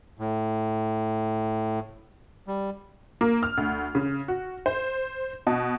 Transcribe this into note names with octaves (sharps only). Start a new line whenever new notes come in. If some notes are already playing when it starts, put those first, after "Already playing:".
A2
G3
A#3
F6
D2
C#3
F#4
C5
B2